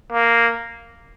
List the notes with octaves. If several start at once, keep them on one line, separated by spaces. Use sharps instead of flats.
A#3